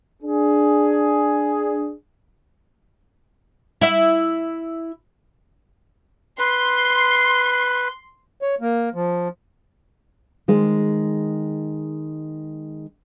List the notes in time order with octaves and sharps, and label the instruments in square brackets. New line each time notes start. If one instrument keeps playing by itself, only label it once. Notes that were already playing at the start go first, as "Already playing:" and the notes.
[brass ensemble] D4 G#4
[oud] E4 E5
[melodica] B4 [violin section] C6
[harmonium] C#5
A#3
F3
[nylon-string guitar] D#3 G#3 G#4 C5